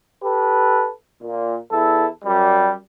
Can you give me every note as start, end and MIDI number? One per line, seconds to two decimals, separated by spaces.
0.23 0.89 67
0.23 0.89 69
0.23 0.89 71
1.22 1.56 46
1.71 2.06 40
1.71 2.06 64
1.71 2.06 69
2.24 2.74 42
2.24 2.74 55